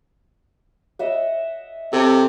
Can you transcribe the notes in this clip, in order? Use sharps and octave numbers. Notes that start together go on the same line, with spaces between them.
D#5 E5 F#5
C3 A4